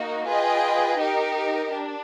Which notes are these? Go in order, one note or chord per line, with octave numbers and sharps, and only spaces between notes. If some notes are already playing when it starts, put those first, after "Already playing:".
Already playing: A#3 D#4 F#4
F4 G#4 B4 D#5 G5
D#4 G4 A#4
D4